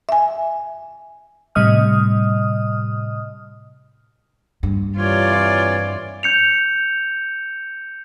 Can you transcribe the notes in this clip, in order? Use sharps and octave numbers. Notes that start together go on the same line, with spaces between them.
E5 G#5
A2 C3 G3 D#5 D#6 F6
G2 A#3
C3 E3 F4 C#5 D5
G6 C#7 F7